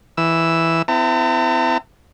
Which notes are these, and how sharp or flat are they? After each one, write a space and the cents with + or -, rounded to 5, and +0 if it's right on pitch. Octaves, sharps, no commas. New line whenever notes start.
E3 +0 E6 +0
C4 -45 E4 +15 A5 +45